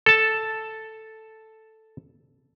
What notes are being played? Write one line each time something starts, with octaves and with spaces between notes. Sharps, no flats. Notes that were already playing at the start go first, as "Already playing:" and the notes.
A4 A5